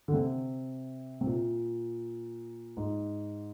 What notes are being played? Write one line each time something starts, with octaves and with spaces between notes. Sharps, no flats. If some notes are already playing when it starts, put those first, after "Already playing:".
D3
C3
C3
A#2
G#2